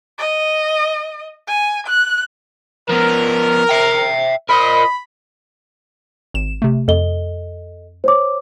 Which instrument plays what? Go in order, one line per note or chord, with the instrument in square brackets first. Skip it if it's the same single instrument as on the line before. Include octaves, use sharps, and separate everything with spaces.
[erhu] D#5
G#5
F#6
[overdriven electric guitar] F3 B3 [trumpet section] A#4
[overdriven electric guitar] E5 G5
[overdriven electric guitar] F4 A#4 [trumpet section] C5 D#5 [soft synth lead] B5
[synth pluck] G#1 E7
C3 A3
[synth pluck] F2 [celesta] A4 D#5 G7
[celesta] C5 C#5 D6